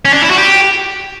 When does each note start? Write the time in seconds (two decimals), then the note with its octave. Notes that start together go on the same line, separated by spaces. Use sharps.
0.05 C#4
0.13 D4
0.22 E4
0.30 F#4
0.38 G4